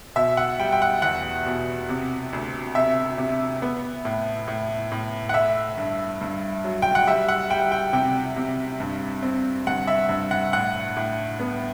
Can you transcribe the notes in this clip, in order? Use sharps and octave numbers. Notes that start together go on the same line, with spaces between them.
B2 E5
F#5
G3 G5
G5
F#5
E2 F#5
B2
C3
D2
C3 E5
C3
B3
A2
A2
A2
F#5
A3 E5
G2
G2
F#3
G5
F#5
G3 E5
F#5
G3 G5
G5
C3 G5
C3
G2
C4
G2 F#5
E5
G2
F#5
A2 F#5
A2
B3